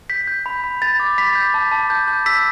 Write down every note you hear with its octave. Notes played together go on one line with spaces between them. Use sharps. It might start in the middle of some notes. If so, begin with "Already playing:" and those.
G6 B6
G6
B5
B5
B5 A6
D6
B5 B6
G6
A5
A5
G6
G6
E6 B6